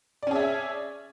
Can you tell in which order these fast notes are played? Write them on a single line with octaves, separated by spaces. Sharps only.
D5 C#4 G#4 E5